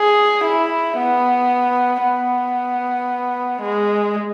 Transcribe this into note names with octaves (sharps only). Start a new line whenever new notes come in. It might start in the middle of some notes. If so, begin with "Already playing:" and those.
Already playing: G#4
E4
B3
B3
G#3